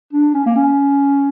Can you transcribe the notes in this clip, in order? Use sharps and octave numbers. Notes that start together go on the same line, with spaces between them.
D4
C#4
A#3
C#4